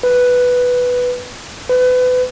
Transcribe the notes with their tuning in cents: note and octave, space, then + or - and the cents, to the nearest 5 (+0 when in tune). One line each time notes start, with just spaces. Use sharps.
B4 +0
B4 +30